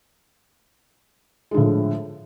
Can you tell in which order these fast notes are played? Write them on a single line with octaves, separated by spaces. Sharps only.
G#3 D3 A2 F3